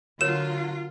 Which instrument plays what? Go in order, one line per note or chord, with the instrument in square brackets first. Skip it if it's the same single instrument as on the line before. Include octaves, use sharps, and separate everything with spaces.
[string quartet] D3 F#3 [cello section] F4 [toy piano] A#4 C#5 [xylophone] E7